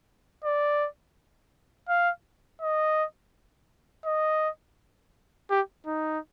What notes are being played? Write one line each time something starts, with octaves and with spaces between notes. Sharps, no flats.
D5
F5
D#5
D#5
G4
D#4